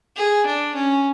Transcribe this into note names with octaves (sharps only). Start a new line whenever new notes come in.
G#4
D4
C#4